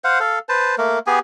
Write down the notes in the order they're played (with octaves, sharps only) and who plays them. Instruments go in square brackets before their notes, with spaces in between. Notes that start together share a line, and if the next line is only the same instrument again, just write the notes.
[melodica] C5 F5 F#5
A4 F5
B4 C5 A5
A3 A#3 A#4
B3 G4 G#4 G#5